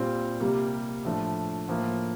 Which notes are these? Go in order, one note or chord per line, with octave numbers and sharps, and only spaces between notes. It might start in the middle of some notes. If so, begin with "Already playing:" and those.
Already playing: A#2 G3 C4 F4
C3 G3 A#3
A2 F3 A3 D4
A2 F3 A#3